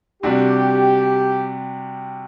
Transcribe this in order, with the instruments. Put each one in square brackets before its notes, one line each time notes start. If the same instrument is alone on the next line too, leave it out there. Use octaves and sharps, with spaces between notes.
[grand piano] C3 G3 D4 F#4 [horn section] G4